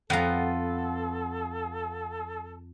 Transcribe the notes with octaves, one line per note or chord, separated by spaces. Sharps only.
F2 B3 F4 A4 A#5